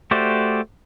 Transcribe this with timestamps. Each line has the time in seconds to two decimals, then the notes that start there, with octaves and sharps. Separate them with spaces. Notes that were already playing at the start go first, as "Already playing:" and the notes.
0.11 A3 F#4 G4 C5 D5